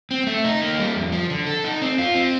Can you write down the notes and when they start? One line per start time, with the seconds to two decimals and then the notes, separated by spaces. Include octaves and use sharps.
0.11 C4
0.27 A3
0.44 D#4
0.61 A#3
0.79 G3
0.96 F2
1.12 F3
1.30 D3
1.47 A4
1.64 D#4
1.82 C4
1.98 F4
2.15 C4